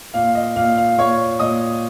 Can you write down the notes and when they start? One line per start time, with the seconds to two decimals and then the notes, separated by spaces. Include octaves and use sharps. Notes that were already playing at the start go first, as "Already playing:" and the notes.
0.14 A#2 F5
0.35 D#5
0.56 A#2 F5
0.78 F5
0.98 A#2 C#5 C#6
1.39 A#2 D#5 D#6